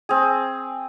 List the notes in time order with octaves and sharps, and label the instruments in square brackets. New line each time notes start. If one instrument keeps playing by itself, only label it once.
[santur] C4 G#4